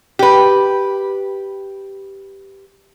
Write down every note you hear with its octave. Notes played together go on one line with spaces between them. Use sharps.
G4 B4